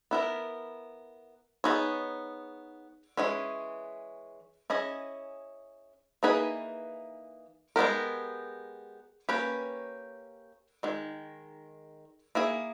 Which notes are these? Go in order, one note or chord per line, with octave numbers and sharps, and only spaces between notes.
B3 E4 A#4
B3 D#4 G#4 C#5
E3 G#3 C#4
C#4 E4 G#4 D#5
E3 A#3 D#4 G#4 B4
G#3 B3 G4 A#4
A#3 C#4 G4 B4
D#3 G#3
A#3 E4 G#4